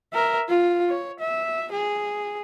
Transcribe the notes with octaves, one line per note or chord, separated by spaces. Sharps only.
A#4 E5
F4
C#5
E5
G#4